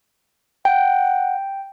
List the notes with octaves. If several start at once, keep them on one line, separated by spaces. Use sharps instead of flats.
F#5 G5